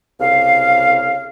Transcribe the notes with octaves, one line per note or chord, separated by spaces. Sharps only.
C2 C#3 F5